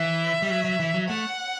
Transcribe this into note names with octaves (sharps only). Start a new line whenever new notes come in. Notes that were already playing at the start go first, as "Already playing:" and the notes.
Already playing: E3 E5
G3
F#3
F#3
E3
F#3
A3 F#5